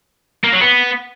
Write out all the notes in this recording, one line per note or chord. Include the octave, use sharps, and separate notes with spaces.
A#3
F#3
B3